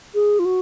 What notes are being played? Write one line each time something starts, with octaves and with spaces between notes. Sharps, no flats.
G#4
F4
F#4